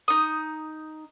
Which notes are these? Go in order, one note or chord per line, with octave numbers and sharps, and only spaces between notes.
D#4 D#6